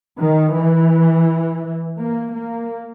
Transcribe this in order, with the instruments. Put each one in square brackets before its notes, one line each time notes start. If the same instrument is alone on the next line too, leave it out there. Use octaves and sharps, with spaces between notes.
[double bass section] D#3
E3
A#3
A#3